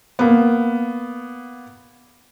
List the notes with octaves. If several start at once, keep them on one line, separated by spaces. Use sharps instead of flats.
A#3 B3